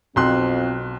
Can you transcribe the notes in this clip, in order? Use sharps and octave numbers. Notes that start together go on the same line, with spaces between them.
B1 F2 C4 C6 F#6